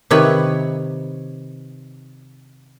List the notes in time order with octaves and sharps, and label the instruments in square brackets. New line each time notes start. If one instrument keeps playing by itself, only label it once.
[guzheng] C3 D#3 B4 C#5 B5